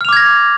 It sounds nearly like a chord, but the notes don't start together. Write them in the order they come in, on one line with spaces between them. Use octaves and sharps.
F6 F7 D6 G#6 A#6